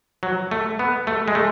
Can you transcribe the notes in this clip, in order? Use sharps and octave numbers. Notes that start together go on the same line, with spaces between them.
F#3
A3
B3
A3
G#3
A3